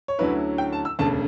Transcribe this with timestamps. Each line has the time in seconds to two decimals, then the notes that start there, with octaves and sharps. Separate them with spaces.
0.08 C#5
0.19 D2 D3 F#3 C#4 E4 B4
0.58 G5
0.73 A5
0.85 E6
0.99 E1 D2 C#3 A5